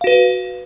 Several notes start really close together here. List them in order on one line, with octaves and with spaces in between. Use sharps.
F5 F#4 B4